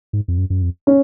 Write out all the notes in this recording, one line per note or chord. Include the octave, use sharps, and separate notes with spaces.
G#2
F2
F#2
F#2
F2
C#4